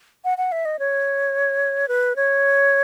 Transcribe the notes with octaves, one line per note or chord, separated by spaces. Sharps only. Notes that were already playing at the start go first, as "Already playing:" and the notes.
F#5
F#5
E5
D#5
C#5
B4
C#5